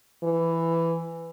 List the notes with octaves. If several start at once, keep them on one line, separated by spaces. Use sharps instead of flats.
E3